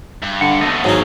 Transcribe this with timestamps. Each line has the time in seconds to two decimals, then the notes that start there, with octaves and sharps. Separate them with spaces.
0.22 G2
0.41 D3 F#5
0.61 D#2 B2 A3 D#5
0.84 G#2 F#3 D#4 G#4